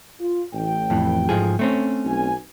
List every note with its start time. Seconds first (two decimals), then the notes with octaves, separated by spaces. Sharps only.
0.19 F4
0.53 A1 G5
0.90 F2 A2 E3
1.29 G#2 F3 G#4
1.59 A3 C4 C#4
2.04 B1 G#5